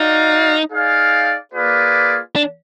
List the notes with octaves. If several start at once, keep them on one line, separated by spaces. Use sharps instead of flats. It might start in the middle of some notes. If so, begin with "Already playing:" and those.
Already playing: D#4 F#4 D5 F5
D#4 G#4 D5 F5
A#3 F4 G#4 B4 D5
D4